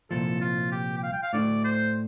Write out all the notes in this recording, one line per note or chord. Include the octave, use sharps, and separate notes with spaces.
C2 A#2 F3 A4
F4
G4
G5
F5
G5
F5
A2 A3 D4 D5
C5